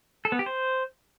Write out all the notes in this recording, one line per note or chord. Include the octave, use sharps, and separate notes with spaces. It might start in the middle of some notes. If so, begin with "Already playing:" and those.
A4
B3
G4
C5